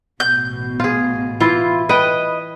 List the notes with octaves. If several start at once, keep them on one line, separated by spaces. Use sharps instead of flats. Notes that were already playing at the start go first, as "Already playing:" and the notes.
A1 B2 G6
F4 G#4
E3 E4 F4
B4 D#5 G5